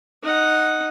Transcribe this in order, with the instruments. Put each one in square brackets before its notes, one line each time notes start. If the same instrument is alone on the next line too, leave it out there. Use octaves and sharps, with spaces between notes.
[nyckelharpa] D#4 F#5